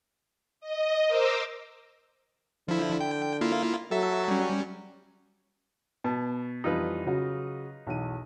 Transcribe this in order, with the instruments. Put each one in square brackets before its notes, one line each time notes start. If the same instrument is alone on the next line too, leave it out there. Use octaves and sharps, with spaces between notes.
[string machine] D#5
A#4 C5 D6 E6
[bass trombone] D3 [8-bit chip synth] F3 E4
[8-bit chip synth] G5
A#3 E4 F4
[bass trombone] F#3 [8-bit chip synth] A4 E5
[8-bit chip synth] G3 C#4
[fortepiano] B2 [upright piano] A5
[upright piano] F2 E3 G3 [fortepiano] D#4 F4 B4
[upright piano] C#3 F#3 F#4
B1 E2 D#7